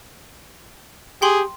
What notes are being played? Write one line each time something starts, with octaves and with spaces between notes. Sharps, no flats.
G4 G#4 G5 C6 F#7